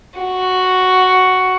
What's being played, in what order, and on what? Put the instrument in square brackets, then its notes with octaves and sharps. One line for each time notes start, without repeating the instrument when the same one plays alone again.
[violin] F#4